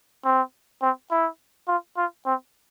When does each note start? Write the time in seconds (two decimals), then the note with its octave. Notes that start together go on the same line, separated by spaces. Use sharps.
0.25 C4
0.82 C4
1.11 E4
1.68 F4
1.97 F4
2.26 C4